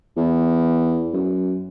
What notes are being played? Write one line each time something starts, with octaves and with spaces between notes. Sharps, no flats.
E2
F#2